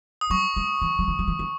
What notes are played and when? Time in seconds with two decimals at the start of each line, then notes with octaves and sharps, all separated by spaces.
0.21 D#6
0.30 F#3 C#6
0.56 G#3
0.82 E3
0.99 F#3
1.08 E3
1.19 F#3
1.28 E3
1.39 E3